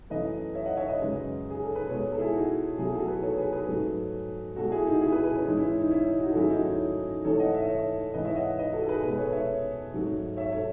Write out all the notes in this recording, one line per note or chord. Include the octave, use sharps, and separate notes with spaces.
F#2 E3 A3 B4 D#5
C#5 E5
D#5 F#5
C#5 E5
B4 D#5
F#2 C#3 G#3
G#4
A4
B4
B2 G#3 A4 C#5
A4
E4 G#4
D#4 F#4
B2 F#3 A3 E4 G#4
F#4 A4
G#4 B4
A4 C#5
G#4 B4
G#4 B4
G#2 F#3 A3
B2 G#3 F#4 A4
E4 G#4
D#4 F#4
E4 G#4
G#4 B4
G#4 B4
C#4
G#2 E3 G#3 D#4
C#4 E4
D#4
C#4 E4
D#4
D#4 F#4
A4
G#2 D#3 F#3 A3 E4 G#4
D#4 F#4
C#4 E4
G#2 E3 A3 A4 C#5
D#5 F#5
C#5 E5
C#5 E5
G#2 E3 G#3 B4 D#5
C#5 E5
D#5 F#5
B4 D#5
F#4 A4
G#4 B4
B2 G#3 G#4 B4
A4 C#5
C#5 E5
G#2 F#3 A3
C#5 E5
A4 C#5